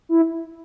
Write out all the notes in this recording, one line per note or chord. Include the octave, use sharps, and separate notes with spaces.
E4